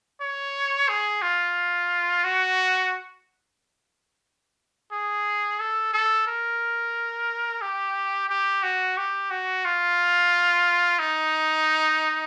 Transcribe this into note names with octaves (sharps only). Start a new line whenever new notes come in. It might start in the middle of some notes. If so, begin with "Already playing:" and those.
C#5
G#4
F4
F#4
G#4
A4
A4
A#4
G4
G4
F#4
G4
F#4
F4
D#4